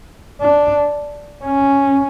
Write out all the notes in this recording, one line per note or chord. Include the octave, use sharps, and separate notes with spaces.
D4
C#4